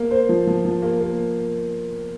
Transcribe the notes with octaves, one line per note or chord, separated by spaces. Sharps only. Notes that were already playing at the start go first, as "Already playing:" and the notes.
Already playing: A#3
C5
F3
F3
F3
A#3
A#3